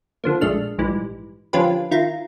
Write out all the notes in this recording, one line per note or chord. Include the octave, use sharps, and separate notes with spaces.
D3 F3 A#3
A#1 G#3 A3 D4 F6
A#1 G#2 E3 G3
D3 F3 C#4 F4 G4 B4
D#3 E4 F4 A#5